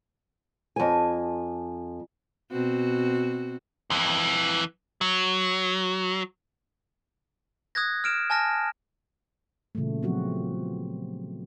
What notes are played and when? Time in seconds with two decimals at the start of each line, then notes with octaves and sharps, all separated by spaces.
0.76 F2 G#5
2.51 B2 C4 F#4
3.90 F2 E3
5.01 F#3
7.75 D#6 F#6 G#6 A#6
8.04 F6 D7 E7
8.30 G#5 A5 F6 A#6
9.75 A#2 C#3 E3 G3 A3
10.03 F3 F#3 B3 C4 F#4 G4